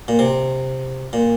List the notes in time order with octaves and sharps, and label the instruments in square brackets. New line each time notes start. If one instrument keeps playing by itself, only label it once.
[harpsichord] A#2
C3
A#2